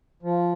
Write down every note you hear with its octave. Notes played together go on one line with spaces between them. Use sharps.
F3